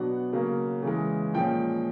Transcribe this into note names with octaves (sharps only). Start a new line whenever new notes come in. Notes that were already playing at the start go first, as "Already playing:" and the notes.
Already playing: B2 F#3 B3 D4 F#5
C#3 F#3 A#3
C#3 E3 G#3
A#2 F3 G#3 C#4 G5